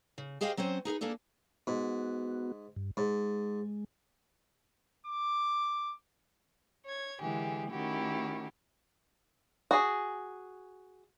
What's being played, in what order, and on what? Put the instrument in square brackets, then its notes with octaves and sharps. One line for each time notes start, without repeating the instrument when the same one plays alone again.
[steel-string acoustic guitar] C#3
G4 G#4 C5 D#5 F5 G5
F#3 C4 C#4 C5
D#4 G#4 A#4 B4
A#3 D4 G#4 A4 D5
[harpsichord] G#2 [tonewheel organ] B3 F#4
[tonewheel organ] G2
[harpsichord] G#2 [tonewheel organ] G#3
[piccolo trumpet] D6
[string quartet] C#5 G#6
D3 E3 G#3 G4 G#4
D#3 A3 C#4 E4 F#4 G4
[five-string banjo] F#4 G#4